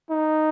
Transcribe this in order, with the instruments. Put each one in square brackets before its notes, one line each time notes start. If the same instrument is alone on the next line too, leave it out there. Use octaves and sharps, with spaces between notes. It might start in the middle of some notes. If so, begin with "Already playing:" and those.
[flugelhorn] D#4